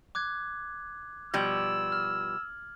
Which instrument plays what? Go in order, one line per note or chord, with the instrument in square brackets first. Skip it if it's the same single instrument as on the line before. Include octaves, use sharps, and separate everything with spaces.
[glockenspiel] D6 F#6 G#6
[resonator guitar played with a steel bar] B2 F3 G3 [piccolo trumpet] E6 [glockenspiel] G#6 F#7
[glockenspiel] F6